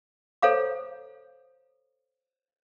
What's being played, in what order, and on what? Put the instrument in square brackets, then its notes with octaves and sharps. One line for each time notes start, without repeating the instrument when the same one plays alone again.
[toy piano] A4 C5 C#5 F5 A#5 D6